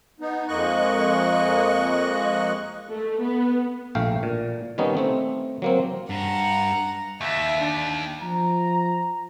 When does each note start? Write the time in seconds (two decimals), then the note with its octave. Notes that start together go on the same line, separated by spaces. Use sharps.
0.20 B3 D#4
0.48 F2 G#3 A#3 D#5 C#6 F#6
2.91 A3
3.21 B3
3.95 A#1 A3 F5 G5
4.23 A#2
4.78 D#3 G3 B3 C#4 D#4
4.97 A3 C4
5.62 F#3 A#3 C4
6.10 G2 F#5 A#5
7.21 D#2 E5
7.60 D4
8.22 F3 A#5